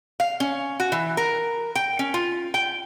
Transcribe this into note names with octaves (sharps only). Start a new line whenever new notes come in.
F5
C#4
F#4
E3
A#4
G5
C#4
F4
G5